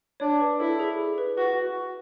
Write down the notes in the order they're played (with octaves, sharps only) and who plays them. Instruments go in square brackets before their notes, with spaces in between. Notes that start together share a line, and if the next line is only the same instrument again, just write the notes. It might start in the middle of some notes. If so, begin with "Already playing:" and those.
[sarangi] D4 [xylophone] C#5
[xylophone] B4
[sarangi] E4 [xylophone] A4
[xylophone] G#4
B4
[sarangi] F#4 [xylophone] B4